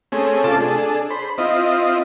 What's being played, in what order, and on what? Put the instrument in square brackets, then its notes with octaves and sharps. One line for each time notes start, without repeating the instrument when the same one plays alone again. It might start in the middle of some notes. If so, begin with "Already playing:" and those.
[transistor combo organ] A3 C4 C#4 G#4
C3 A3 F4 A4 A5 D6
D4 G#4 A4
C5 B5
C4 E4 F4 D#5